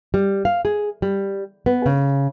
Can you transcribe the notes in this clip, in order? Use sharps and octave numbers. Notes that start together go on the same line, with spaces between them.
G3
F5
G#4
G3
B3
C#3